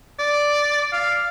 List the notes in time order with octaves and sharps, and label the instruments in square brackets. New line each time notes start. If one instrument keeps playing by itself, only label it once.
[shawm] D5
F5